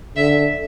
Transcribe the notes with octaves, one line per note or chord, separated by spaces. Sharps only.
D3 E5